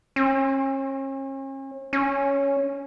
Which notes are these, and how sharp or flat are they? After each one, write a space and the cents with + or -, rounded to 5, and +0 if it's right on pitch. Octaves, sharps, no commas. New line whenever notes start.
C#4 -40
C#4 +5